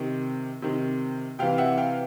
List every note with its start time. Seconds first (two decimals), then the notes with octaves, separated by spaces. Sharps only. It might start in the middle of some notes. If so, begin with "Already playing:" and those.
Already playing: C3 D#3
0.62 C3 D#3
1.39 C3 E3 F5 G5
1.58 E5 F#5
1.78 F5 G5